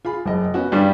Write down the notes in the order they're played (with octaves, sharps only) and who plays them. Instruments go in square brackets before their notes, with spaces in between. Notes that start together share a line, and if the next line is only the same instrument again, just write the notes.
[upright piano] F4 G#4 B5
F#1 D#5
B3 C#4 F#4
[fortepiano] G2 G3